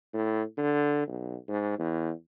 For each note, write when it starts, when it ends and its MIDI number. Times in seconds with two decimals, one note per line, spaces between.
0.14 0.43 45
0.58 1.07 50
1.08 1.36 35
1.48 1.79 44
1.79 2.11 40